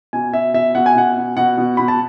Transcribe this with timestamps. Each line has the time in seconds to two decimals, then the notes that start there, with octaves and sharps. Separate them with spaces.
0.13 B2 G#5
0.33 B2 E5
0.54 B2 E5
0.75 B2 F#5
0.86 G#5
0.95 B2 F#5
1.16 B2
1.37 B2 F#5
1.58 B2
1.77 B2 B5
1.88 A5